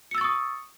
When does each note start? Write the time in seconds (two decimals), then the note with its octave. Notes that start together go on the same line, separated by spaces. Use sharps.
0.11 C#7
0.15 E6
0.18 A6
0.21 C#6
0.24 D#6